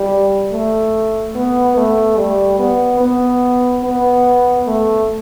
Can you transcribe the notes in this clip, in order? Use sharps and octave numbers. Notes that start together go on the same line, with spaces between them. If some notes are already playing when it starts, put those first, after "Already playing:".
Already playing: G3
A3
B3
A3
G3
B3
B3
B3
A3